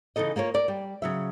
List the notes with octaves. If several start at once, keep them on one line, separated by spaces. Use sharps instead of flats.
C#3 E3 D#4 A4 D#5
A#3 F4 A#4 C#5
A#4 D5
G3
C#3 F#3 E5